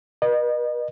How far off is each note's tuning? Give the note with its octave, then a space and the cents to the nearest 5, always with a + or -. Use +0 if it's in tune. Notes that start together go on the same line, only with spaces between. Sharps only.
B4 -40 D#5 -35